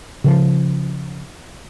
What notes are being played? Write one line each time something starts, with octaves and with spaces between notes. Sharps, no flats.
C#3 F3